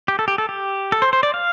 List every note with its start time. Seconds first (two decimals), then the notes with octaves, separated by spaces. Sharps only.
0.08 G4
0.19 A4
0.28 G4
0.38 A4
0.49 G4
0.92 A4
1.02 C5
1.13 C5
1.23 D5
1.34 F5